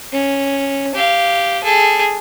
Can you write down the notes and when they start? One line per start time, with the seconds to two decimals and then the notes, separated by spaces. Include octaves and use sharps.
0.12 C#4
0.95 G4 F5
1.64 G#4 A4